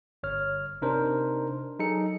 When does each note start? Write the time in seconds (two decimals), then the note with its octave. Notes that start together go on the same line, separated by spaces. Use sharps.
0.23 G1 C#5 F6
0.82 C3 D4 D#4 A#4 C5
1.79 F#3 D#4 G#4 A4 C#7